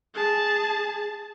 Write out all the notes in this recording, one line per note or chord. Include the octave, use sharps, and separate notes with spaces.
G#4 A5